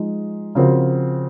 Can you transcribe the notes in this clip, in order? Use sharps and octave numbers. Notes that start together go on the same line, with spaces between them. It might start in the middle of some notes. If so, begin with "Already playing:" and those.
Already playing: F3 G#3 D#4
C#3 F3 C4 F#4 A#4